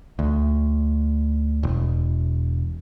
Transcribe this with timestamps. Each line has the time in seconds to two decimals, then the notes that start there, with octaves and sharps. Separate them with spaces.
0.19 D2
1.63 E1